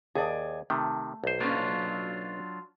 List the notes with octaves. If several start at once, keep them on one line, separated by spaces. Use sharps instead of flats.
D#2 G#4 D5
C3 D#3 A3
B1 C5
F#3 A#3 C#4 D4 F4